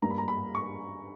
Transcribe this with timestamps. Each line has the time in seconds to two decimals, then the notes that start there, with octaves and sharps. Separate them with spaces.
0.02 G2 G3 A#3 A#5
0.10 B5
0.18 A#5
0.28 B5
0.55 C#6